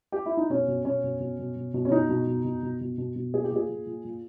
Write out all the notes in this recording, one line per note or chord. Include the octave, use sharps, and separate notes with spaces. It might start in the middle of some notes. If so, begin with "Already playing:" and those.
G4
E4
D#4
B2 C#4
B2
B2 C#4
B2
B2
B2
B2
B2
C#4
B2 D#4
B2
B2
B2
B2
B2
B2
B2
A#2 G#4
G4
A#2 G#4
A#2
A#2
A#2